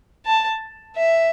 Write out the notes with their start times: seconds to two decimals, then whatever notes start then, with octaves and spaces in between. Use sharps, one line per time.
0.26 A5
0.96 E5